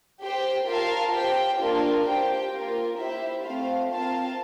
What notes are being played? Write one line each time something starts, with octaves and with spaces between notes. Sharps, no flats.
G4 C5 G5
F4 A#4 F5 A5
G4 C5 G5
A#3 D4 F4 A#4
G4 C5 G5
A#3 F4 A#4
E4 G4 C5 E5
A3 C4 F4 C5 F5
C4 F4 A#4 F5 A5